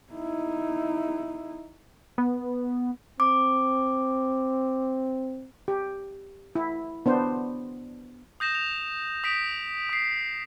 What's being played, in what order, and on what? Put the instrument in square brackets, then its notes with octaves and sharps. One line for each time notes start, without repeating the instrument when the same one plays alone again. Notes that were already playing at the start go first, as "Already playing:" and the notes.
[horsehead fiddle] D#4 E4
[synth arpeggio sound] B3
[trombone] C4 [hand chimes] D6
[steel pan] G4
E4
B3 D4 C5
[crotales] D#6 G6 A#6 E7
F7
D#6 B6 D7
D#6 C7